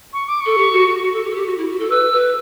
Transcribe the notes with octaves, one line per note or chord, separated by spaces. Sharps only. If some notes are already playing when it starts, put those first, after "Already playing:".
C#6
D6
C#6
A4
G4
F#4
F#4
F#4
A4
G4
A4
G4
F#4
E4
F#4
A4
B4 E6
B4